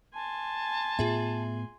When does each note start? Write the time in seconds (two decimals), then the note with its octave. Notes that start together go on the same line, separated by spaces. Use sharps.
0.14 G#5 A5 C6
0.99 A2 B3 F4 G#4 E5